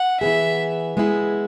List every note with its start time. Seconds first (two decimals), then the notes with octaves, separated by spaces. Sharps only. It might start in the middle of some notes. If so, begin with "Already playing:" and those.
Already playing: F#5
0.21 E3 B3 G#4 E5
0.97 G#3 B3 E4 G#4